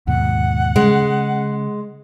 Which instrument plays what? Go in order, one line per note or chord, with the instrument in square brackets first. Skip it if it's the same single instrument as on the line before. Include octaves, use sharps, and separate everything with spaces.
[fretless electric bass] D#2 G#2 B2 [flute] F#5
[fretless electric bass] C#3 [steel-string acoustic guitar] G#3